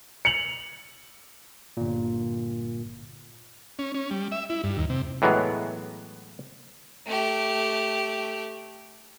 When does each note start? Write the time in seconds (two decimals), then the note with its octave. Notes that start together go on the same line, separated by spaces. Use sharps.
0.25 C#7 F7 F#7
1.77 G1 A#2
3.79 C#4
3.94 C#4
4.11 G3
4.32 E5
4.50 E4
4.64 G2
4.77 D#2
4.90 C3
5.22 A2 E3 F#3 G#3 B3
7.07 A3 G4